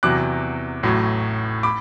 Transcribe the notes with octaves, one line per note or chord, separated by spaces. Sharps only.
E2 C3 F#3 D6 F#6
A1 A2 F#3
B5 D6